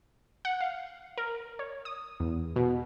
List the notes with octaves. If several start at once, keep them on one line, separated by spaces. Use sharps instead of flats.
F#5
F5
A#4
C#5
D#6
E2
B2